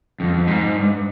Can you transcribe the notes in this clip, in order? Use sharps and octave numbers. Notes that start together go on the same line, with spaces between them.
F2
F2
G#2
G2